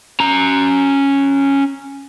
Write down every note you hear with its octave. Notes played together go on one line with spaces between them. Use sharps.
C#4 A#5